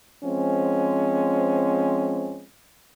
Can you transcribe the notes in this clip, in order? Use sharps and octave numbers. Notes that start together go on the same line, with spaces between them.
F3 G#3 C4 C#4